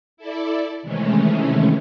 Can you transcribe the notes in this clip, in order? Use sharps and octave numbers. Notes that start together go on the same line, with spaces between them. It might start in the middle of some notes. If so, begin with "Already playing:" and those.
E4 A4 D5
C3 D#3 E3 G#3 A3 C#4